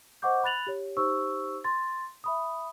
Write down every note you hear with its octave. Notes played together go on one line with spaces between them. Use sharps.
C5 D#5 F#5 C#6 D6 G6
B5 F#6 A6 F7 F#7
G4 C#5
D#4 G4 C5 C#6 E6
C6 A6
E5 B5 D#6